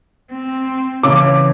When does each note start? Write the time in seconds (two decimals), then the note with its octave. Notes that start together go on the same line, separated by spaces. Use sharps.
0.32 C4
1.03 C#3 E3 A5 D6